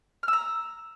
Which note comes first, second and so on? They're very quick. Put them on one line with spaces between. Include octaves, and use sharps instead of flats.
F6 E6 A#5